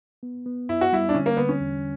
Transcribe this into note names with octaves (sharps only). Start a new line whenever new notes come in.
B3
B3
F#2 E4
F#4
G3 E4
D4
D3 C#4
A#3
D3 B3
C#4
E2